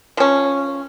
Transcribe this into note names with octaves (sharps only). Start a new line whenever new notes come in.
F3 C#4